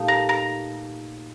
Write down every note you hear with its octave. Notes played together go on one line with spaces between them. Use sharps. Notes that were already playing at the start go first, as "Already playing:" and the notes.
Already playing: A#2 A3 D#4 G4
A#5
A#5